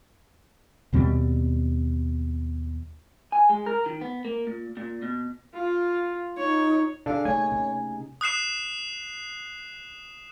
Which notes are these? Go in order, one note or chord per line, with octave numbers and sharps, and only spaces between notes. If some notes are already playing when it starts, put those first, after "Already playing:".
D#2 B2 G3 C4
G#5
G#3
A#4
D#3
B3
A#3
A#2
A#2
B2
F4
D#4 C#5
C3 D4 G#4 A4 F5
A3 A#3 D#4 C#5 G#5
C3 C#4
D#6 F#6 C7 E7